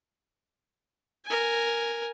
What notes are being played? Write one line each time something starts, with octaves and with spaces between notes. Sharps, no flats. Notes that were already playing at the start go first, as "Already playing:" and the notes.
A#4 G#5